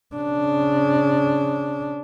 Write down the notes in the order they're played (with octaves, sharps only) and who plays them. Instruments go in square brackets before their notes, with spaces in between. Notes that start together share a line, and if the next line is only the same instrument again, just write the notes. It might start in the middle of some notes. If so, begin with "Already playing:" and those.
[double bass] C#3 D4